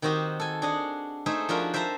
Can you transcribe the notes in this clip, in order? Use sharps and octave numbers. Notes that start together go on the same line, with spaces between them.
D#3 C4 F#4 G4 D#5
A4 G#5
D4 G#4 D#5 F#5
A3 D#4 G#4 C5 E5
F3 D4 F4 F#4 A#4 E5
C5 E5 G5 A5 A#5